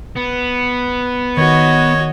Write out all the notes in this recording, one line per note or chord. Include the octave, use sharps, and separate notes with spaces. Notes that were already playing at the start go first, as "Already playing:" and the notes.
B3
D#3 F#4 C#5 D#5